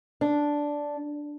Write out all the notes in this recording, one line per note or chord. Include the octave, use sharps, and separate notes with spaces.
D4